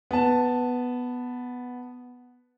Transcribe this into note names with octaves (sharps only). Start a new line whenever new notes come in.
B3 A5